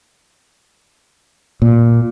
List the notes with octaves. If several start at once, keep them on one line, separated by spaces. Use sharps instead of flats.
A#2